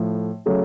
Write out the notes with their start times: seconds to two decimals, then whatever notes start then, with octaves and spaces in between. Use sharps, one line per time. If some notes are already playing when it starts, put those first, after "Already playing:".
Already playing: A2 F3 A3
0.46 C#3 F#3 A3